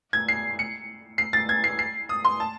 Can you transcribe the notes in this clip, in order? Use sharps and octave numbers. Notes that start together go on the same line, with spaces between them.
G#6
C7
C#7
C7
A6
G#6
C7
C7
D#6
C6
A5